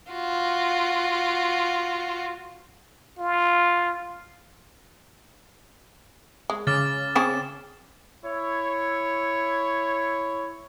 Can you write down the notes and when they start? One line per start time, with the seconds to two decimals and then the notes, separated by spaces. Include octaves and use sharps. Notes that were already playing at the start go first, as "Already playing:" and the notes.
0.12 F4 F#4
3.19 F4
6.50 G#3
6.67 C#3 D6 F6 A6
7.16 C4 C#4 G#4 E7
8.25 E4 C#5